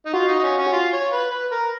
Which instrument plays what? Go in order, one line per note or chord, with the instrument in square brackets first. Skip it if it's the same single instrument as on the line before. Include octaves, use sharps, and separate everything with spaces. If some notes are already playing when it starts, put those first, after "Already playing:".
[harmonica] D#4
[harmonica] F4 [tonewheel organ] F#4
[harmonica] D#4
D#4
C#4
C#4
F4
C#5
B4
B4
A#4